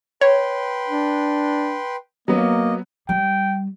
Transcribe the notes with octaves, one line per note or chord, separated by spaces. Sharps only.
B4 C#5 G5 C6
D4
F#3 A#3 B3 D#5
G3 G5